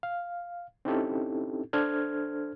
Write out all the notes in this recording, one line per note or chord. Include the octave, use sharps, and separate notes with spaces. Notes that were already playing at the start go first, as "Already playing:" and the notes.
F5
C4 C#4 D#4 E4 G4 A4
D4 A4 C5 F6 G#6